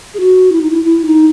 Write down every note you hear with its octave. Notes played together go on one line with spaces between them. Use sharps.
G#4
F#4
E4
D#4
E4
E4
D#4